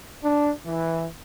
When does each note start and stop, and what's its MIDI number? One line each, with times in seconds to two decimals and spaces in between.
0.22 0.51 62
0.65 1.05 52